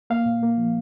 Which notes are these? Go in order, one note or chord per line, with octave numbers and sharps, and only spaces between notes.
A#3 F5
A#2
A#3
F3